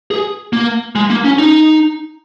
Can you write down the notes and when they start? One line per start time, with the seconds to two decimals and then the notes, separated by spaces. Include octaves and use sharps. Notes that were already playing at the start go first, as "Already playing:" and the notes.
0.11 G#4
0.53 A#3
0.95 G#3
1.10 A#3
1.24 C#4
1.39 D#4